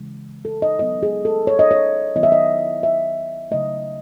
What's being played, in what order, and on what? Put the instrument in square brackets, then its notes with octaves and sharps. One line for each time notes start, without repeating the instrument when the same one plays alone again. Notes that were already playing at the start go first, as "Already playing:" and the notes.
Already playing: [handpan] C#3 E3 G#3
A4
D#5
F#3 B3 D#4 D#5
G#4
A4
C#5
D#5
C#5
D#3 F#3 B3 E4 D#5
E5
D#5
E5
C#3 F#3 A3 D#5